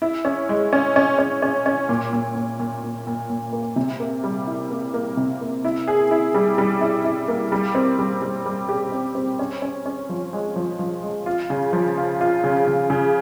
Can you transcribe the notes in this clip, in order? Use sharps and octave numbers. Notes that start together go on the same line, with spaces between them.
E4
C#4
G#3
C#4
C#4
C#4
C#4
C#4
A#2
A#2
A#2
A#2
A#2
A#2
A#2
A#3
C3
A#3
G3
E4
A#3
A#3
C3
A#3
E4
G#4
E4
G3
G3
E4
E4
A#3
G3
C4
G3
G3
G3
G4
C4
C4
C#4
C#4
C#4
F3
G#3
F3
F3
G#3
F4
C#3
F3
F4
F4
C#3
C#3
C#3